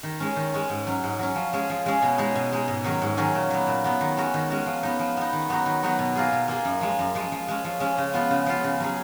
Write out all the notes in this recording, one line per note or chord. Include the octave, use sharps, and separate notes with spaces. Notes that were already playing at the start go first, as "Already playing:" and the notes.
D#3
G#3 C#4
D#3
G#3 C#4
G#2
F#3 C#4
G#2
F#3 C#4
F3
G#3 C#4 G#4
F3
G#3 C#4 G#4
B2
G#3 D#4 G#4
B2
G#3 D#4 G#4
G#2
D#3 F#3 C#4 G#4
G#2
D#3 F#3 C#4 G#4
A#2
F#3 B3
A#2
F#3 B3
D#3
G#3 C#4 F#4
D#3
G#3 C#4 F#4
F3
B3 D#4
F3
B3 D#4
D#3
F#3 B3 D#4 F#4
D#3
F#3 B3 D#4 F#4
B2
A#3 F4 G#4
B2
A#3 F4 G#4
F#2
F3 G#3
F#2
F3 G#3
F3
G#3 C#4
F3
G#3 C#4
C#3
F3 B3 F4
C#3
F3 B3 F4
C#3
F#3 C#4 G#4